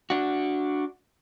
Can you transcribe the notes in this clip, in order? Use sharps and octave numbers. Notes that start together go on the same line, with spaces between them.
D4 F#4